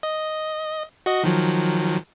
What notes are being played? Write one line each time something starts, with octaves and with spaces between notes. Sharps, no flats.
D#5
F#4 D#5
D#3 F3 F#3